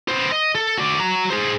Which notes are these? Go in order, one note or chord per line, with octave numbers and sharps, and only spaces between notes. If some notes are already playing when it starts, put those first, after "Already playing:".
B3 C5
D#5
A4
F#4 D5
F#4 A#5
G#4 C5